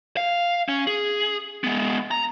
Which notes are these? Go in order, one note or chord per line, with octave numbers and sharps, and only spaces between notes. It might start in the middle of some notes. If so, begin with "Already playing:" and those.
F5
C#4
G#4
G#3 B3
A#5